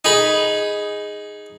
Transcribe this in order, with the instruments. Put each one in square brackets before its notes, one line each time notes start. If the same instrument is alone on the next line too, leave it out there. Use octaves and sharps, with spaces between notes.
[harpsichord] D#4 G#4 B5